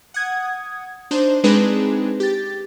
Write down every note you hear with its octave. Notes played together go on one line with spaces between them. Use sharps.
F#5 D#6 G#6
D4 D#4 C5
G#3 C4 D4 D#4 G#4 B4
G4 A6